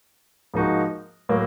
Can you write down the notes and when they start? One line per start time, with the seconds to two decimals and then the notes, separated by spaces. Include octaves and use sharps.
0.54 G#2 F3 A#3 D#4 F#4
1.29 A2 F#3 A#3